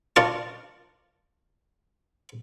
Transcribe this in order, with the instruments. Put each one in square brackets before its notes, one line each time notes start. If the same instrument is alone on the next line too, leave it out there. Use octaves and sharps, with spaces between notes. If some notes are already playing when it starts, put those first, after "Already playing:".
[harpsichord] D4 F4 A#4 A5 C#6